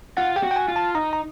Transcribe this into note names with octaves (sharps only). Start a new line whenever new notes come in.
F4 F#5
G4 G5
F#4
G5
G#5
F4
A5
D#4 A#5
A#5